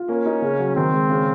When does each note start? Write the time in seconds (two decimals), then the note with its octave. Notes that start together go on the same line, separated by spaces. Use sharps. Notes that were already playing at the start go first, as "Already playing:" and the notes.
Already playing: F4
0.08 A#3 C#4
0.26 D#4
0.42 C#3
0.59 F#3
0.76 D#3 C4
0.93 G#3
1.10 C#3